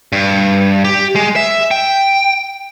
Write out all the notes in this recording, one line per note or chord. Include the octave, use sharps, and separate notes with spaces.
G2
G4
G#3
E5
G5